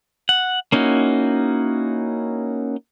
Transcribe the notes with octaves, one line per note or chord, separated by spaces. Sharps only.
F#5
A#3 C#4 D#4 E4 F#4